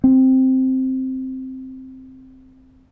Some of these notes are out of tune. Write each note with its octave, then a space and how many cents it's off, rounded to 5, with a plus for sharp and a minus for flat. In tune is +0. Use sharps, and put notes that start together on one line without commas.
C4 +0